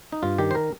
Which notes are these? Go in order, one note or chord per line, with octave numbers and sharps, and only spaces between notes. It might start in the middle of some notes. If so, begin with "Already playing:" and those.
D#4
G2 F4
D#3 G4
C5
A#4